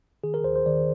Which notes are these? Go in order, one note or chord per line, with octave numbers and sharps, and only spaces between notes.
D#3 G#4
A#4
D#2 C5
C5
D#3 D5